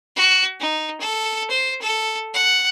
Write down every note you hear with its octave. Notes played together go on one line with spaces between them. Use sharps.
F#4
D#4
A4
C5
A4
F#5